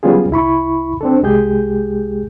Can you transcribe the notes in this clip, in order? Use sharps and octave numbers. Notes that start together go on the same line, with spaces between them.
F#3 G3 B3 C#4 F4 G#4
C2 E4 B5 C#6
C4 D4 A4
C2 G#3 G4 G#4 G6